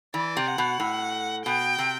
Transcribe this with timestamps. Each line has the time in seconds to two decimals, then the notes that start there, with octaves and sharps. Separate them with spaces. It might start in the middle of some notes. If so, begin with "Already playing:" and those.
0.14 E3 D5
0.37 C3
0.47 F#5
0.58 B2
0.80 A2
1.46 B2 G5
1.79 C3